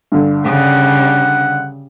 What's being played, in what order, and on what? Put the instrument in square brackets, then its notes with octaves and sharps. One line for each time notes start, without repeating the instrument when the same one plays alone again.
[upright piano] G2 D3
[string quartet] C#3 G3 [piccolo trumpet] F#5